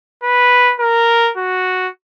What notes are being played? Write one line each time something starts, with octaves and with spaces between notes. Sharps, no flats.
B4
A#4
F#4